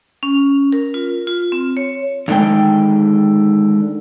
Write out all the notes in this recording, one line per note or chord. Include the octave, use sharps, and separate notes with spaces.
C#4
A#4
F4
F4
C4
C#5
F2 D3 D#3 G#3 G5